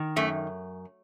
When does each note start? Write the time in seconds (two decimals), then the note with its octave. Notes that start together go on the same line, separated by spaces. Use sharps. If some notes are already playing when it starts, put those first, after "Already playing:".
Already playing: D#3
0.16 F#2 A3